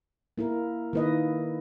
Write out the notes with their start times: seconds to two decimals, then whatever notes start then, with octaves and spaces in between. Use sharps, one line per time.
0.38 A#3 E4 A#4
0.93 D#3 A#3 E4 B4 D#5